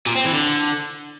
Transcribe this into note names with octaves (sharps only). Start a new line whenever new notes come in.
A#2
C4
E3
D3